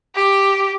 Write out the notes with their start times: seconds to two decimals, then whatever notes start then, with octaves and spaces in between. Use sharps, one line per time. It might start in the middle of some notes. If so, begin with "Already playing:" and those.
0.15 G4